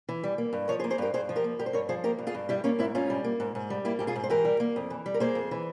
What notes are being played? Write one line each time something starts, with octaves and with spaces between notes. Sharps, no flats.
E3
G3
A#3
G2
F3 A#4 C#5
G#4 C5
A#3
G#4 C5
G2 G4 A#4
G2 G#4 C5
F3
G4 A#4
A#3
G2 G4 A#4
C5
G2 A#4 C#5
F3 G#4 C5
A#3 G4 A#4
G2
F4 G#4
G2
G3 E4 G4
A#3 C#4 F4
G#2 C4 E4
G#2 C#4 F4
G3
A#3
G#2
G#2
G3
A#3 E4 G4
G#2 G4
F4 G#4
G#2
C5
E3 G4 A#4
G3
A#3
F2
E3
G3
A#4
A#3 G#4 C5
F2
E3